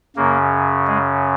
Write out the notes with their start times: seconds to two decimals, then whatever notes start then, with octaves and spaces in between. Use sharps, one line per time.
0.16 F#2 C#3 A#3
0.87 G#3